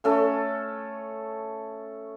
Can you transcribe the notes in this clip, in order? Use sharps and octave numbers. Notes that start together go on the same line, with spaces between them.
A3 C#4 A4